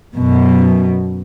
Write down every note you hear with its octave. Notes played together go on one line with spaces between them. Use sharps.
F#2 B2